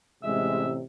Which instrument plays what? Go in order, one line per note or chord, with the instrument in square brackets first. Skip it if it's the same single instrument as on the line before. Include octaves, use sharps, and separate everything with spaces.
[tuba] A1 [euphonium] C3 [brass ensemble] G#3 [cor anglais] E5